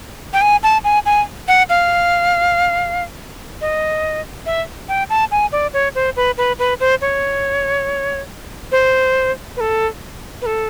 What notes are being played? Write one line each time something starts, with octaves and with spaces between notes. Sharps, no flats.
G5
G#5
A5
G#5
G#5
F#5
F5
D#5
E5
G5
A5
G#5
D5
C#5
C5
B4
B4
B4
C5
C#5
C5
B4
A4
B4
A4